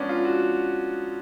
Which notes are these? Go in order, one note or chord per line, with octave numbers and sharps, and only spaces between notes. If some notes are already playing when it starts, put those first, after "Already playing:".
Already playing: G#2 F3 B3 C#4 D4
F4
F#4